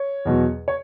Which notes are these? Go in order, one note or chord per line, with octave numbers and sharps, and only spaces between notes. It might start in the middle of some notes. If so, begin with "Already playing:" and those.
Already playing: C#5
E2 B2 F#3
C#5